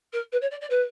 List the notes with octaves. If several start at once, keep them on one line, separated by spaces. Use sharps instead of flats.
A#4
B4
C#5
D5
D5
B4